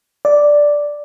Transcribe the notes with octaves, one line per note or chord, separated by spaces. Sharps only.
D5